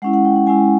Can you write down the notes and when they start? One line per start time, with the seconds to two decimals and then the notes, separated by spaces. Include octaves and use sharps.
0.02 G#3 C#4 E4 F#5
0.14 F#5
0.25 G5
0.35 F#5
0.47 G#3 C#4 E4 G#5